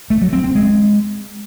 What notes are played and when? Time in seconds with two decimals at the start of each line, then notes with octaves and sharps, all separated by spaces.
0.10 A3
0.22 F#3
0.33 C4
0.44 C4
0.55 G#3